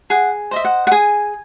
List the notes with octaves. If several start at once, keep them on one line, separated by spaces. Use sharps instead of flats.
G#4 F#5
C5 D#5 E5
F#5
F#5
G#4 G#5